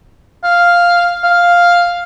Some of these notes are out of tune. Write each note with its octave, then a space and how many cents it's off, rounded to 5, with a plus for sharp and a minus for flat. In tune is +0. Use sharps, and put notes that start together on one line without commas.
F5 +0
F5 +0